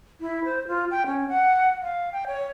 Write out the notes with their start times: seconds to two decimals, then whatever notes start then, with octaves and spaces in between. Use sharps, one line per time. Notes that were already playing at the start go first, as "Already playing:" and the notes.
0.21 E4
0.44 C5
0.68 F4
0.91 G5
1.06 C#4
1.29 F#5
1.82 F5
2.12 G5
2.27 C#5